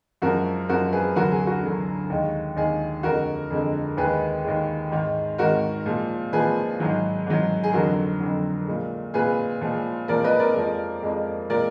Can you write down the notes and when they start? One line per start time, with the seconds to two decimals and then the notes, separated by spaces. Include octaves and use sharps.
0.22 F#2 F3 G#3 F#4 A#4
0.69 F#2 F3 G#3 F#4 A#4
0.92 G#4 B4
1.16 D2 D3 F#3 F#4 A#4
1.31 G#4
1.47 F#4
1.63 D2 D3 F#3
2.10 D#2 D#3 G#3
2.56 D#2 D#3 G#3 G#4
3.03 F2 D3 G#3 F#4 A#4
3.50 F2 D3 G#3
3.97 D#2 D#3 G#3 G#4 B4
4.44 D#2 D#3 G#3
4.91 G#2 D#3 G#3
5.38 G#2 D#3 G#3 F#4 A#4
5.86 A#2 F3 G#3
6.32 A#2 F3 G#3 G#4 B4
6.80 G#2 D#3 F#3
7.27 G#2 D#3 F#3
7.64 G#4
7.73 F2 D3 F#3 F#4 A#4
8.20 F2 D3 F#3
8.67 A#2 G#3
9.14 A#2 G#3 G#4 B4
9.61 A#2 F3 G#3
10.08 A#2 F3 G#3 A#4 D5
10.24 B4 D#5
10.39 A#4 D5
10.55 F2 F3 G#3
11.02 F2 F3 G#3
11.49 A#2 G#3 A#4 D5